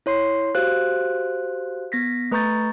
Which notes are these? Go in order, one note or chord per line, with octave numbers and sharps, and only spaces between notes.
E4 C#5 C6 C7
F#4 G4 C5 F5 F#6
B3 A#6 B6
A3 B4 A#5 C#6 G6 A6